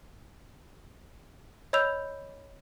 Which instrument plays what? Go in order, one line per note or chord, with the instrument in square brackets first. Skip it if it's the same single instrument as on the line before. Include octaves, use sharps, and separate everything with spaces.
[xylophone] C#5 D#5 B5 E6 G6 F7